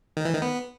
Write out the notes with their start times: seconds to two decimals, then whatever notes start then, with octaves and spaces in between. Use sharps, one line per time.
0.17 D#3
0.25 E3
0.34 D#3
0.42 B3